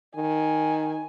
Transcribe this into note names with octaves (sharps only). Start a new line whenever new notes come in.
D#3 G#5